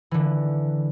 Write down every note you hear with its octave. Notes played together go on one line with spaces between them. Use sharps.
D3 E3